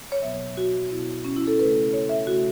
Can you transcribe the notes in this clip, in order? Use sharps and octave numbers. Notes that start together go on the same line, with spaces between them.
C#5
B2 F#3 B3 E5
F#4
B2 B3 E4
C#4
E4
A4
C#3 A3 B4
C#5
E5
C#3 A3 F#4